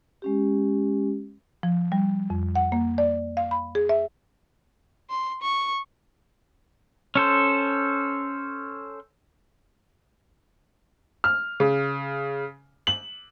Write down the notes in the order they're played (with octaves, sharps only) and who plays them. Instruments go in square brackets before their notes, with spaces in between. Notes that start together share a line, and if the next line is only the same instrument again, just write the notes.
[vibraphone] G#3 C#4 G4
[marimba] F3
G3
F2
F#5
A#3
D5
F5
B5
G#4
E5
[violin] C6
C#6
[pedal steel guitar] C#4 A4 C5
[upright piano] F6
C#3
F#7